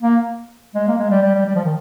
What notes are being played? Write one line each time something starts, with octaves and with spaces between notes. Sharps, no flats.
A#3
G#3
A#3
G#3
G3
G3
G3
G3
F3
D#3